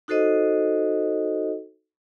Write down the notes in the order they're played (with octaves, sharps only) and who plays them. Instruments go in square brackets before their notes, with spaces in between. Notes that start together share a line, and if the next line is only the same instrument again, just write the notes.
[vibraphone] D#4 F#4 A4 C5 D#5